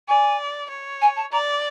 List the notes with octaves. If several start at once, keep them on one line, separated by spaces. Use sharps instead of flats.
D5 G#5
C#5
G#5
A5
D5 A#5